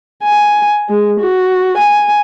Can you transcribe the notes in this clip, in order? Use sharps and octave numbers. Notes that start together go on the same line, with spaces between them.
G#5
G#3
F#4
G#5